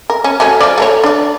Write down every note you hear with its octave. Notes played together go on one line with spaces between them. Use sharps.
A#4
C#4
F#3 A3 C#4
F3 F#3 D5
A3 A#4 C#5
D4 D5